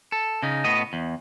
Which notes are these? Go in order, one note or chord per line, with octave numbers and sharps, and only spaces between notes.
A4
C#3 D#4
A2 B3 D#5
E2